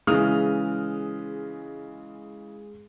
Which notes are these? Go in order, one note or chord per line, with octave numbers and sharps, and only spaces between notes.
C#3 E3 G#3 D#6 F6